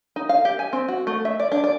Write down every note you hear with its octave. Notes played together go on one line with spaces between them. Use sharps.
D#4
F5
G4
G#5
C4
F#4
A3
E5
D5
D4
D5